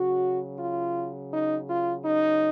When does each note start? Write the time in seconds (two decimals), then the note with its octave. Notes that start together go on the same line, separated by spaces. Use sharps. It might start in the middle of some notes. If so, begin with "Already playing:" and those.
Already playing: C#3 F#3 F#4
0.58 F4
1.32 D#4
1.68 F4
2.05 D#4